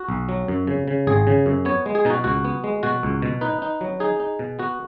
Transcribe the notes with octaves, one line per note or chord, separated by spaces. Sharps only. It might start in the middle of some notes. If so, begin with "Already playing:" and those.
Already playing: F#4
B1
F#3
F#2
C#3
C#3
G#1 G#4
C#3
F#2
B3 C#5
G#3
G#4
B2 D#4
F#4
C#2 F#4
B3
G#3
B2 F#4
C#2
B2
D#4 B4
D#4
F#3
D#4 G#4
D#4
B2
B3 F#4